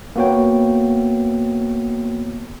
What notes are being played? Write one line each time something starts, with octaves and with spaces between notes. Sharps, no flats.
A#3 B3 F#4 C#5 G5